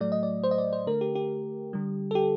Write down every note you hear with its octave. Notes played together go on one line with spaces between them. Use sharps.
A2 F#3 A3 D5
D#5
D5
C5
D#5
D5
C5
D3 A3 A#4
G4
G4
D3 G3
A4
G4